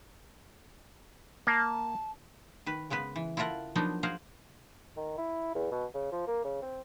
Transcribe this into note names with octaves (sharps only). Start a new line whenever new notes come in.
A#3 A5
D#3 B4
C#3 G#3 B3 B4
E3
E4 F4 A4 A#4 F#5
F3 F#3 A#3 B3 D4 D#4
G#4 A#4 C5 F5 F#5
D#3
E4
E2
B2
C#3
F3
A#3
C#3
C4